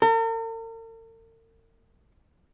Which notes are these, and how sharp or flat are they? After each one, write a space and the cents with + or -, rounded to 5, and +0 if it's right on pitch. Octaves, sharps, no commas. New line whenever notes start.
A#4 -45